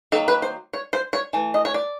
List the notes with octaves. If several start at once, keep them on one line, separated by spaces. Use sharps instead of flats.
D#3 F#3 A#3 A4
B4
C5
C#5
C5
C#5
E3 A3
D#5
C#5
D5